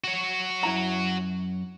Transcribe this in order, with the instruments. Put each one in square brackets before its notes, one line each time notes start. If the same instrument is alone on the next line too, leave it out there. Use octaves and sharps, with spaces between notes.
[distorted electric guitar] F#4 C#5
[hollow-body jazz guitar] F#2 E4 A#5